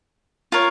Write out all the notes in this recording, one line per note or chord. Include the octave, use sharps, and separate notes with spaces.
F4 A#4 C#5